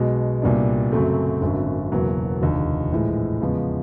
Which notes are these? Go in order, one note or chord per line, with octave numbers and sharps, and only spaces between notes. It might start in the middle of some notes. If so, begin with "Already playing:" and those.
Already playing: B1 B2 G#3
C2 A#2 G3 B3 D4
F#2 C#3 F#3 A3 C4
G#1 F#2 D3
E1 E2 C#3 F#3 A#3
F1 D#2 D3
A#1 A2 E3 G#3
E2 C#3 F3 G#3 B3